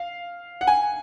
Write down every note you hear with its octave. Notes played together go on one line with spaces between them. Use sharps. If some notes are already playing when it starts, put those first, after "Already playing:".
Already playing: F5
F#5
G#5